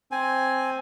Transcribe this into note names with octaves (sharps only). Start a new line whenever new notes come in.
C4 G#5